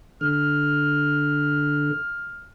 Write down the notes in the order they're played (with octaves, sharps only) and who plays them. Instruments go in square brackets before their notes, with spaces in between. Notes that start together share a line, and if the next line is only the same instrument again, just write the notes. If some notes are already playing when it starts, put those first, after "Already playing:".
[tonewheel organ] D3 [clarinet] F6